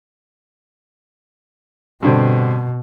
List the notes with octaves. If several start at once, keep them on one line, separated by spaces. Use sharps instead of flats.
G2 B2 D3 C4